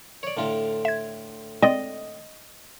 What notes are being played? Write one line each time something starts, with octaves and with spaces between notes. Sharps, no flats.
C#5 D5
A2 D3 F4
E5 G#6
C4 D5 D#5 G5